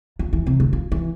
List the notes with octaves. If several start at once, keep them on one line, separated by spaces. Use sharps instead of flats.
F3
E3
C3
D3
F3
E3